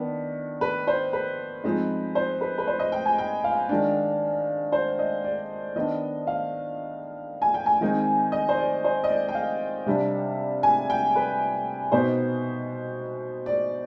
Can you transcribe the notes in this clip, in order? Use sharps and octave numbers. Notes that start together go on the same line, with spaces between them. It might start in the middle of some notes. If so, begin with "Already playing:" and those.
Already playing: D#3 B3 D4
B4
C5
B4
F3 G#3 C4 D#4
C5
B4
B4
C5
D#5
G5
G#5
G5
F5
D#3 G#3 D4
C5
D#5
D5
D#3 B3 D4 D#5
F5
G#5
G5
G#5
D#3 G#3 C4 D#4
D#5
C5
D5
C5
D#5
D5
G5
F5
C3 G3 D4
G#5
G5
B4
B2 B3 D#4 C5
D5